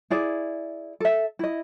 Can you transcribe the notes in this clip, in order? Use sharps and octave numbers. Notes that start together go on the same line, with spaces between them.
E4 G#4 D5
A4 E5
E4 D#5